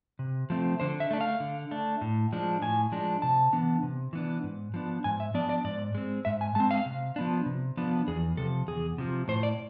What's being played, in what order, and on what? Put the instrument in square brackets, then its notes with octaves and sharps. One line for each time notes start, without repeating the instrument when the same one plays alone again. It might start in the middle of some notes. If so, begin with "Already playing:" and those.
[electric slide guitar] C3
F3 A3 C4
D3 C5
E5
A3 D4
F5
D3
A3 D4
A2
F3 G#3 D4
A2 G#5
F3 G#3 D4
C3 A5
E3 B3 D4
C3
E3 B3 D4
G#2
F3 B3 D4
G#2 G#5
E5
F3 B3 D4 D5
D5
G#2 D5
G#3 C4
G#2 E5
G#5
G#3 C4 A5
F5
C3
F3 B3 D4
C3
F3 B3 D4
E2 G#4
C3 F3 A4
E2 G#4
C3 F3
A2 C5
D5